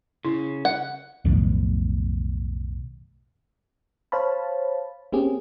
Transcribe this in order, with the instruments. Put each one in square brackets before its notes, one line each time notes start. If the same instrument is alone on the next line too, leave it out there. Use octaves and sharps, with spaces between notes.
[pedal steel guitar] C#3 [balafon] E4
[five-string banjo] F#5
[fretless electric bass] B1 F2 A2 D#3
[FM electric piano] C5 C#5 F5 A5 B5
A#3 C4 C#4 G4 G#4